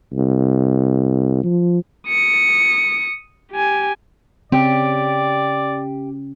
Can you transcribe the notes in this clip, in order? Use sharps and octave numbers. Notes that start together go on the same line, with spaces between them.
C2
F3
D#6 C#7
G4 G#5
C#3 C4 G4 D5